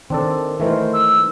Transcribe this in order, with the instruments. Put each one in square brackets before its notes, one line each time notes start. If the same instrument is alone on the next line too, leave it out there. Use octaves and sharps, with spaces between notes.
[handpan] D#3 [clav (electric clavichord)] C4 D4 A4
[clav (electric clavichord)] D#3 E3 A3 [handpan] A#4 C5
[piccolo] E6